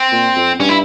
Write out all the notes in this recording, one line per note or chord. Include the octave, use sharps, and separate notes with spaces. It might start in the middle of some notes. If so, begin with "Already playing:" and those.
Already playing: C4
A#2
F2
G2 C#4
E4